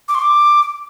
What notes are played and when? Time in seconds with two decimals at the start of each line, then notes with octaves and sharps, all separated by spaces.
0.08 D6
0.15 C6
0.22 D6